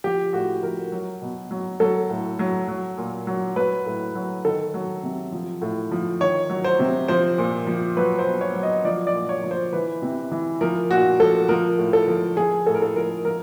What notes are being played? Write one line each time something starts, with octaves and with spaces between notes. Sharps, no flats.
F3 G4
A2 F#4
F3 A#4
F#3
B2
F#3
F#3 A4
A2
F#3
F#3
A#2
F#3
F#3 B4
A2
F#3
D#3 A4
F#3
C3
F3
A2
F3
D#3 C#5
F#3
C5
C3
F3 C5
A#2
F3
F#3 B4
C5
B2
C#5
F#3
D#5
F3 D5
D5
A#2
C#5
F3
C5
E3 B4
C3
E3
F3 A#4
A#2 F#4
F3 A4
F3 A#4
A2
A4
F3
F3 G#4
A2 A4
A#4
A4
F3 A#4
F3 A#4